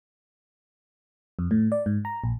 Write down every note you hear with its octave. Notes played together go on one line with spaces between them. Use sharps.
F2
A2
D5
G#2
A#5
A#1